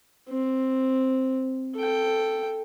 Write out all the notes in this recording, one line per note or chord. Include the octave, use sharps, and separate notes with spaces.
C4
A4 G5